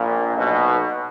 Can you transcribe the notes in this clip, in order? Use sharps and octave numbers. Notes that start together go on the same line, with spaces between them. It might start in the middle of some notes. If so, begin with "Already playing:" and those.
Already playing: A#1 A#2
B1 B2